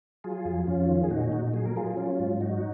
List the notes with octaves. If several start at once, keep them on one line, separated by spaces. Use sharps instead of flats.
F#3 F4 G#4
F2
F2 C#4 F4
D#3
G#4
A#2 D#4 F#4
A#2
F#3 G#4
A#4
F#3 F4 G#4
F#3 C#4 F4
G#2
F#3 D#4 F#4